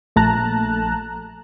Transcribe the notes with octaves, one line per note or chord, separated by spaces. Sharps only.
A#1 A3 A5 A#5 F#6